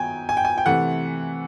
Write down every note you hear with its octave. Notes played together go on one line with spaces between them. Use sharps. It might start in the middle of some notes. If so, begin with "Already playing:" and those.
Already playing: D#3 F#3 B3 G5 G#5
G#5
G5
G#5
G5
C3 E3 A3 F#5